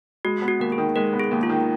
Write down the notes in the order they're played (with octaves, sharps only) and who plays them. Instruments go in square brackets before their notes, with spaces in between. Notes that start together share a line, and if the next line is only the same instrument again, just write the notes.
[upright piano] G#3 [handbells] F#4
[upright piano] B3
[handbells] F#4
[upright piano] D#2 [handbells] A#4
[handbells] G#4
[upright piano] D#3
[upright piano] G#3 [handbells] A#4
[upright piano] B3
[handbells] G#4
[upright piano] D#2
[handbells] F4
[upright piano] D#3